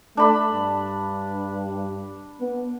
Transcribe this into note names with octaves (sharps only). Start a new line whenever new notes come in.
A3 D4 B5
G2
B3